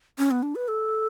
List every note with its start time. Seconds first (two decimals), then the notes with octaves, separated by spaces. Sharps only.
0.18 C#4
0.31 B3
0.43 D4
0.55 B4
0.68 A4